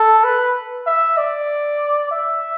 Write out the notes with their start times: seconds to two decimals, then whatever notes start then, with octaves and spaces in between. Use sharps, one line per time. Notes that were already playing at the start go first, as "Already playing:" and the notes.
Already playing: A4
0.24 B4
0.86 E5
1.17 D5
2.11 E5